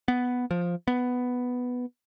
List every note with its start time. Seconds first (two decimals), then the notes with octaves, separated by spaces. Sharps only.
0.08 B3
0.51 F3
0.88 B3